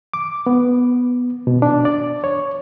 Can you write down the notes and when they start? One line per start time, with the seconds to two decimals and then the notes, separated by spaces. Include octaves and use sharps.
0.14 D6
0.46 B3
1.47 B2
1.62 D4
1.85 D5
2.24 C#5